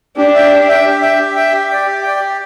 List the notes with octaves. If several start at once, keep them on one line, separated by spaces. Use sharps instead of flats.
D4 G4
E5 G5
G4
E5 G5
G4
E5 G5
G4
E5 G5
G4
D5 G5
G4
D5 G5
G4